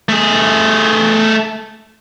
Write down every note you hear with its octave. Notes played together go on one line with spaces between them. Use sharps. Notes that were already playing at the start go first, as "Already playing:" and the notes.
A3 G#4